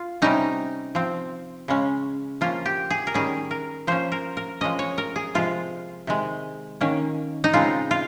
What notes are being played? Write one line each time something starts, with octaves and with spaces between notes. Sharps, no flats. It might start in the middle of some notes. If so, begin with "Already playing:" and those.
Already playing: F4
C3 G3 C#4 D#4
F3 C4
C#3 G#3 C#4
F3 A#3 C#4 F4
G4
G#4
A#4
D#3 G3 C#4 G#4
A#4
F3 A#3 C#4 C5
A#4
A#4
F3 G#3 C#4 D#5
C#5
A#4
G#4
C3 F3 G#3 F4
C3 D#3 G#3
D#3 A#3 C#4
D#4
C#3 G#3 C4 F4
F4